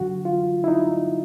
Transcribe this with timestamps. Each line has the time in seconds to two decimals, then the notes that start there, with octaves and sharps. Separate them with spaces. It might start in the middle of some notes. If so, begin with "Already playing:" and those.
Already playing: F#2 D3 F#3 F#4
0.25 F4
0.64 E4
0.68 D#4